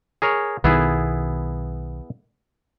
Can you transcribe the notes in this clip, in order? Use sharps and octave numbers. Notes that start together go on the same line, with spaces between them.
G#4 A#4 C#5
B1 D#3 B3 E4 G#4